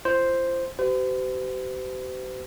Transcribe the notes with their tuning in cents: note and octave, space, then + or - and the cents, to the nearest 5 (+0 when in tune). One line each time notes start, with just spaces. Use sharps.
F4 -40 C5 +0
G4 -40 C5 -45